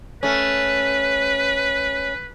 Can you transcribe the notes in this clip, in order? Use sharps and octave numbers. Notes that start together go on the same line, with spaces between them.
A3 C#4 B4